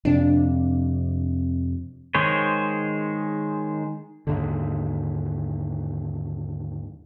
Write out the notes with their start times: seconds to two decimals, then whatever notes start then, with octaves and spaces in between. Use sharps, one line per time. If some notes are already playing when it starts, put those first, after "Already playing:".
0.05 F2 C3 D4
2.15 D#3 G#3 G#4 C5 C#5
4.27 D#2 G#2 D3